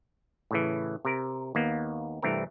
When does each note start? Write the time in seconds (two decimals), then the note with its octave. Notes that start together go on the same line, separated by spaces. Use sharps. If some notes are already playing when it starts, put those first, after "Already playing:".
0.51 A2 C#3 E3
1.05 C3 A#4
1.55 D#2 A#3 B3
2.22 C2 G2 E3 A3 C4 A#4